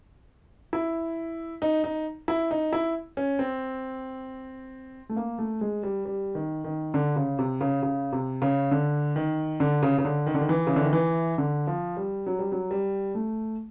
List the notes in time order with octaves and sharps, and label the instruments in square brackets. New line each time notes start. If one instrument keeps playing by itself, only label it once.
[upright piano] E4
D#4
D#4
E4
D#4
E4
C#4
C4
A3
A#3
A3
G#3
G3
G3
D#3
D#3
D3
C#3
C3
C#3
C#3
C3
C#3
D3
D#3
D3
C#3
C#3
D3
D#3
D3
D#3
E3
C#3
D3
D#3
E3
D3
F3
G3
F#3
G3
F#3
G3
A3